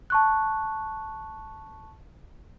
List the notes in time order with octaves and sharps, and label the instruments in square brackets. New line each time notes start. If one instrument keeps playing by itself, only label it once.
[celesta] A5 C#6 F#6